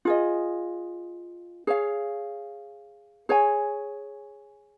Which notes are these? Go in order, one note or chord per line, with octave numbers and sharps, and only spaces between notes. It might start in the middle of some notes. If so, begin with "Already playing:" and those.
F4 G#4 D#5
G#4 C#5 F5
G#4 C#5 G#5